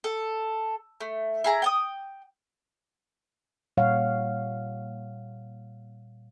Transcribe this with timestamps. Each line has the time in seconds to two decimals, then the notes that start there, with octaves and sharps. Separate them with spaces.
0.04 A4
1.01 A3
1.44 E4 G#4 A#5
1.62 G5 A5 D#6
3.77 A#2 G3 C#5 F5 F#5